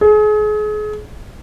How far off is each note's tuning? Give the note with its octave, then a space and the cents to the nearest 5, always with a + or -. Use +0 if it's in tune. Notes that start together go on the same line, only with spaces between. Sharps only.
G#4 +35